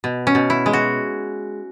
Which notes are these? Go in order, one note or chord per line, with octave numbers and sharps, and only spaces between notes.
B2
C#4
B2
E4
G#3
F#4